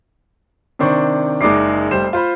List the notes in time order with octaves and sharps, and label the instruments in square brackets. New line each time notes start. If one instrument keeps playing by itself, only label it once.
[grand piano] C3 D#3 D4 C5 D5 C#6
F#1 G#3 D#4 D5 D6 C7
F1 G3 C5 E7
F4 C5 B5